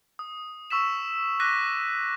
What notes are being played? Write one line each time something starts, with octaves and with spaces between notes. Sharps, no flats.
D#6
C#6 E6 B6 E7
D6 F#6 A#6 B6 D#7